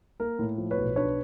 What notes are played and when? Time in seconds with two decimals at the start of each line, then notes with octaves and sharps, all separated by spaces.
0.20 A#3 A#4
0.39 A2
0.58 F3
0.71 B4 C#5
0.77 B1
0.96 D4 B4 C#5